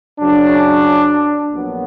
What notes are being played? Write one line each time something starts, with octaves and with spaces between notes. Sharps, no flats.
F#2 C#3 F#3 D4
A#1 A#2 F#3 B3